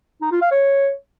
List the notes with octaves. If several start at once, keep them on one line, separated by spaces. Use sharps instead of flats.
D#4
F4
F5
C#5